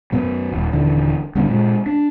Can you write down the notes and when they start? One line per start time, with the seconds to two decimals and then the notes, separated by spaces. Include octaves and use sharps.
0.12 F#2 B2 F#3
0.52 D#1
0.72 D#1 D3 E3
1.35 F#1 G2 B2 D3
1.48 A#2 G#3
1.86 D4